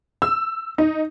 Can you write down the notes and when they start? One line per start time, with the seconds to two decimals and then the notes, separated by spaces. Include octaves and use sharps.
0.22 E6
0.78 D#4